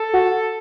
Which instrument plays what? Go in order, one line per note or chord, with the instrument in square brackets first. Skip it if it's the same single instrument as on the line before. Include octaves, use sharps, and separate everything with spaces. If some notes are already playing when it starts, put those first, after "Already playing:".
Already playing: [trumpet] A4
[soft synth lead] F#4